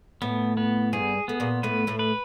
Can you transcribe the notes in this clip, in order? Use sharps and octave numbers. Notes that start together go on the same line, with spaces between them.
A2 A3 B3
B3
G2 G3 G#4
A3 B3
A#2 A#3
A2 A3 B4
A2 A3
B4